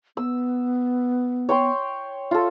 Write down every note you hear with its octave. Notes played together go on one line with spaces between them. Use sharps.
B3 E6
C#5 G5 C6
F4 A4